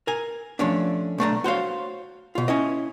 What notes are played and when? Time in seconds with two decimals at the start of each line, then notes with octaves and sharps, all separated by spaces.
0.07 A#4 G#5
0.59 F3 A3 C#4 D4
1.18 B1 A3 D4 A#5
1.44 F#4 C5 C#5 F5
2.35 B2 F4
2.48 C#4 E4 D#5